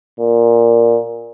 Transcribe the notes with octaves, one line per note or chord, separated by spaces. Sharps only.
A#2